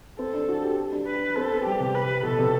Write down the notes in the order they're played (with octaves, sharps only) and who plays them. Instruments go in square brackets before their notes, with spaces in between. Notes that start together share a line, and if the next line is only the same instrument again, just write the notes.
[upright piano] C4 [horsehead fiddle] A4
[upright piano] D4
F#4
G4
D4
[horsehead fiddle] B4
[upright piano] C4 [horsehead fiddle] A4
[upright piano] B3
[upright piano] G3 [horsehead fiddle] G4
[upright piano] C3
[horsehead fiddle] B4
[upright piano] B2 [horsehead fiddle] A4
[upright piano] C3